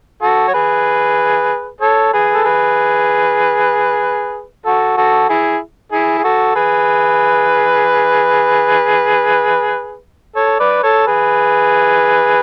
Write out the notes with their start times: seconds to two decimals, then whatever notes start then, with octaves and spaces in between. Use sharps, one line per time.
0.22 F#4 A4
0.48 C#5
0.54 G#4 B4
1.81 A4 C#5
2.13 G#4 B4
2.34 A4
2.44 G#4 B4
4.66 F#4 A4
4.97 F#4 A4
5.29 E4 G#4
5.92 E4 G#4
6.18 G#4
6.24 F#4 A4
6.55 G#4 B4
10.36 A4 C#5
10.60 B4 D5
10.83 A4 C#5
11.07 G#4 B4